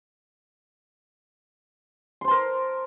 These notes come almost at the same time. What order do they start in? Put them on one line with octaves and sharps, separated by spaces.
C6 C5 A5 A#4